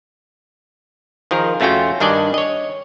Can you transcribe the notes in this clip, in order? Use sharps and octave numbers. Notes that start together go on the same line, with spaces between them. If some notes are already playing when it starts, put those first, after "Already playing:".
D#3 F3 G#4 A#4
F2 A3 C#4 F4 F#4 G5
G2 D#3 D4 D5 D#5 G#5
C#5 D#5